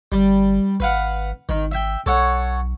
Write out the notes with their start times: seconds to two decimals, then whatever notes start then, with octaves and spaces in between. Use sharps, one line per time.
0.12 G1 G3
0.80 G#1 B4 F5 F#5
1.49 G#1 D#3
1.71 E5 G5
2.06 B1 A4 C#5 F#5